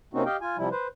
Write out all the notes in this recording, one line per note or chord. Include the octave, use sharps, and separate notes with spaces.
C3 A#3 C4 C#4 D#4 F#4
G4 D#5 F5 G5
F4 G#5
C3 F3 G3 E4
B4 C5